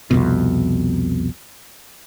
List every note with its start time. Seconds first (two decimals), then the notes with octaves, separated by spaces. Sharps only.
0.11 C2 F2 B2